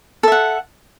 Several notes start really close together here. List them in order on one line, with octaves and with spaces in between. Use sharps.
A4 E5 F#5